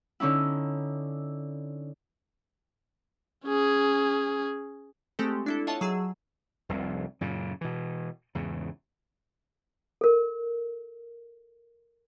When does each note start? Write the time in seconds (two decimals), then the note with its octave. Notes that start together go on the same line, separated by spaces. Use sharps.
0.20 D3 C#4 D#4 E4
3.44 C#4 G#4
5.19 G#3 A3 C4 G4 A4
5.46 D4 E4 A4
5.67 F4 C#5 D#5 E5 F#5 A5
5.81 F#3 G#4 E6
6.69 F1 C2 F2
7.21 F#2 A#2 C#3
7.61 B2 E3
8.35 E2 G#2 C#3
10.01 A4 A#4